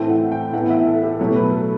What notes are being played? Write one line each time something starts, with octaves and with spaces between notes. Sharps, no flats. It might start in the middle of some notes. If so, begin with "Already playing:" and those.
Already playing: A2 E3 A3 C4 G5
F#5
G5
A2 E3 B3 F#5
E5
A4
G4
B2 F#3 A3 A4
B4
A4